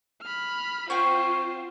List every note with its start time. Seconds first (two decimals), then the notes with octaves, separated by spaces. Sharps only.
0.22 B5 F6
0.90 C4 F4 F#4 C5 C#5